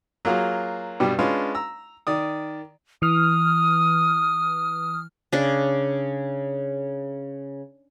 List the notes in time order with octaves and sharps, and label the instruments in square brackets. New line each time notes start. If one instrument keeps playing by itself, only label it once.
[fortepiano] F#3 A#3 F4 G#4
G2 B2 G3 G4
G#3 C#4 D4 F4 B4 F5
A#5 E6
D#3 D5 D#6
[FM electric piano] E3 F6 [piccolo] D#6
[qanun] C#3 D4